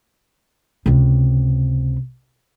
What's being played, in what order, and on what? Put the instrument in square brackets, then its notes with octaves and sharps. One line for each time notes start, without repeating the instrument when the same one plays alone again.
[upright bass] C#2 C3